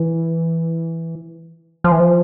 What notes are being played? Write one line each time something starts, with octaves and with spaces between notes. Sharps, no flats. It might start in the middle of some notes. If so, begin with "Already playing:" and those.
Already playing: E3
F3
E3
F3